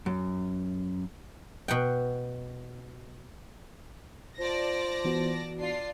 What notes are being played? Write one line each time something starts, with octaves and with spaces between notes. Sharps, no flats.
F#2
B2 F#5 G5
F4 C5 D5 A5 A#6
E3 B3 F#4
D4 F4 D5 C7